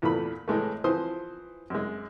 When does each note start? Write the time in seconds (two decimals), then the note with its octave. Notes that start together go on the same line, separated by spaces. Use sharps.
0.02 E2 A#2 E3 A3 B5
0.48 A2 E3 G#3 A3
0.84 E3 F3 C5 C6 D#6
1.70 F#2 G#3